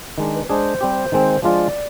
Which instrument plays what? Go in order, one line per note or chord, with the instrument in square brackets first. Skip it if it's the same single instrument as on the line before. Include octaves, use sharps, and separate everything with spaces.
[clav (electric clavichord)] D#3 G#3 D4
[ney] B4
B4
[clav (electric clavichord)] G#3 D4 G#4 [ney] C5
[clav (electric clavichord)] G3 C4 G4
D#3 G#3 C4
[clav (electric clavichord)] F3 G#3 D4 F4 [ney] D5